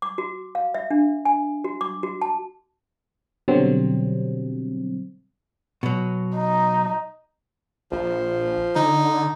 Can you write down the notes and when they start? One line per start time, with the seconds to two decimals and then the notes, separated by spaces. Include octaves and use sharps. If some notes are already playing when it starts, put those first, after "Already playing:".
0.02 D6
0.18 F#4
0.55 F5
0.74 E5
0.91 D4
1.25 G#5
1.64 F#4
1.81 D6
2.03 F#4
2.22 A5
3.48 B2 D3 F#3 G3 C4
5.83 B2 F#3
6.36 D#4
7.92 A#1 F3
8.76 D3 D#4